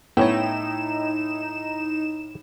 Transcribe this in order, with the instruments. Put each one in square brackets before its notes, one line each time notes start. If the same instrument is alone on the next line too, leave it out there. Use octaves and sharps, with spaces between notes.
[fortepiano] A2 E4 G5 [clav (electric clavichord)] B3 C#4 C#5 [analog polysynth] D#4 E7